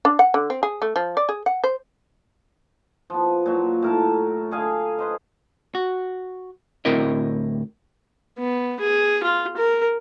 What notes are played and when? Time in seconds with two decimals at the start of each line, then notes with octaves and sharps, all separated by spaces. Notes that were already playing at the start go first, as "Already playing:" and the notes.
0.05 D4
0.19 F#5
0.34 D3
0.50 C4
0.63 G#4
0.82 A3
0.96 F3
1.17 D5
1.29 G#4
1.46 F#5
1.64 C5
3.10 F3 B3
3.46 A#2 F#3
3.82 A2 A#4 A5
4.51 D3 G#4 F5 G#5
4.99 B4 C5 D#5
5.75 F#4
6.85 D2 A2 C4 E4 A#4 D#5
8.38 B3
8.80 G#4
9.23 F4
9.57 A#4